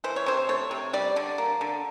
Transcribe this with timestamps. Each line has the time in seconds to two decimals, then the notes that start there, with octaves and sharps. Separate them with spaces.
0.04 E3 C5
0.16 C#5
0.26 C3 C5
0.49 A3 C#5
0.71 C3
0.93 G3 D5
1.16 D3
1.38 A#3
1.61 D3